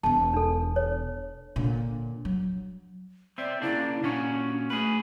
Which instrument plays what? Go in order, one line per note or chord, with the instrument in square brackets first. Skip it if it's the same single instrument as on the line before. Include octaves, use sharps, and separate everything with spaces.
[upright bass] E1 E2 [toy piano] A5
[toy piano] D4 A4
C#5
[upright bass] A#2 D3
F#3
[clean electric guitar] C4 E5 [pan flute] D5
[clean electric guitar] C#3 A#3 D4 [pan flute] E4
[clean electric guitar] A#2 C#4 F#4 [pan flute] D4
[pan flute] A3 [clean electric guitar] G#4 B4